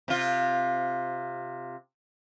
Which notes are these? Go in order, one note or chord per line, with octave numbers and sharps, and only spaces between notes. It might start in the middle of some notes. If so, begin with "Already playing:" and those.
C3 F4